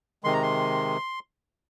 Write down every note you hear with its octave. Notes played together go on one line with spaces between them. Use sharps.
C3 D#3 G#3 C6
A#5
C6